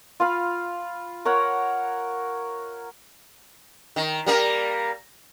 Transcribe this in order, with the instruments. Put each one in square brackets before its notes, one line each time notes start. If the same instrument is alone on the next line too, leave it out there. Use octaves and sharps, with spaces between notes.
[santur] F4 F5 B5
A#4 C#5 F#5
[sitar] D#3
G3 A#3 A#4